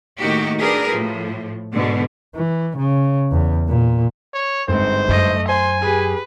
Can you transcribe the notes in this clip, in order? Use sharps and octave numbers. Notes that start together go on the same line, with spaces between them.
A2 D#3 A#3 D#4 F#4 G4
D4 G4 G#4 A#4 B4
A2 F3
G#2 B2 D3
E3
C#3
E2
A#2
C#5
G1 G#2 C4 C5
F#2 A3 D#5
C5 G#5 C6
G4 G#4 B4